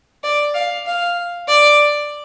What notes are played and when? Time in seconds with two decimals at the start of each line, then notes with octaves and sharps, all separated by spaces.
0.23 D5
0.54 F5
0.87 F5
1.48 D5